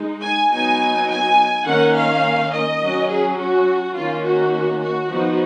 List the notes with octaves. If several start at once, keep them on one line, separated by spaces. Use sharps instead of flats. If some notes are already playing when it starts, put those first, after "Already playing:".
Already playing: G#3 D#4
G#5
F#3 B3 D#4 G#5
G#5
D#3 A#3 C#4 F#5
F5
D#5
F#3 C#4
G#4
F#4
D#3 A#3 C#4 F4
F#4
F#4
F3 B3 D#4